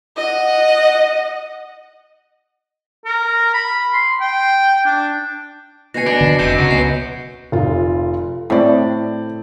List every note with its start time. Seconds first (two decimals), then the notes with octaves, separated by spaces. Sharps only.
0.17 D#5 F#5
3.06 A#4
3.54 B5
3.93 C6
4.21 G5
4.86 D4
5.94 B2 G#5 A#6 C7 C#7
6.06 B3 D4
6.21 D3
6.39 F1 C3 D4 D#5 G6 A#6 C#7
6.58 C#2 C#3 C#4 F#4
6.71 B3 C7
7.52 F1 F4
8.50 A2 C4 D5